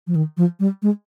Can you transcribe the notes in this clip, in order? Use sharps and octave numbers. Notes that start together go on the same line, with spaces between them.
F3
D#3
F3
G3
G#3